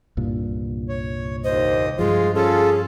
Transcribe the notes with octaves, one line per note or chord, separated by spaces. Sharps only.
C2 G2 A#2
C#5
D#2 C5 D#5
G2 F3 G#3 F4 G#4
C#4 F4 G#4 A4